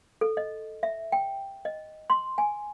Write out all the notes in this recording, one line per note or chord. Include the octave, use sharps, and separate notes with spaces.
A4
D#5
E5
G5
D#5
C6
G#5